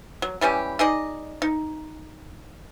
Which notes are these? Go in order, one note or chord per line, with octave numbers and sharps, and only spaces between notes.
F#3
E3 G3 C#4 G4
D#4 G#4 D5 D#5
D#4